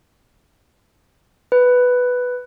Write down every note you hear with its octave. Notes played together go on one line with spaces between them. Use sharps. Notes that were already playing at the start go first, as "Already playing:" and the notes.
B4